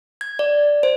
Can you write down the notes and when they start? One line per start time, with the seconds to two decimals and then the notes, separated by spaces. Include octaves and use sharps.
0.21 G#6
0.39 D5
0.83 C5